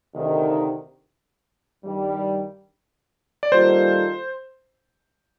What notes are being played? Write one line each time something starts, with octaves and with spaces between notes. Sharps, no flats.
D2 C3 D#3
G2 D#3 G3
D5
D#3 G3 A#3 F4 A4 C5